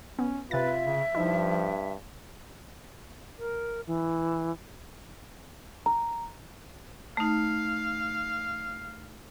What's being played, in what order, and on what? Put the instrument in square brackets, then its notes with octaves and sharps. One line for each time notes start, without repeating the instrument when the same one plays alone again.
[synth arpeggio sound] B3 [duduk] C#4
[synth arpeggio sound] C3 A6 [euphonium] F4 [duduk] B4 [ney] E5
[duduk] C#3
[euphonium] G2 [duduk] F3 [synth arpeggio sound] D#4 E4
[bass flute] A#4
E3
[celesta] A#5
[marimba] A3 D#4 [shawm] F5